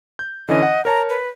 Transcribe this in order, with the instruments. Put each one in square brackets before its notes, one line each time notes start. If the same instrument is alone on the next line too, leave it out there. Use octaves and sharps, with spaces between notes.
[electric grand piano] G6
[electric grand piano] D3 E3 C#4 [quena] D#5
[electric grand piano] F#5
[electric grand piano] A#4 C#5 A5 [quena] A#5
[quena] B4